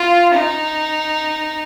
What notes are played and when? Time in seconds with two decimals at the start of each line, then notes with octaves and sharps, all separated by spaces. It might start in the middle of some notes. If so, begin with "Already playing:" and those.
Already playing: F4
0.34 D#4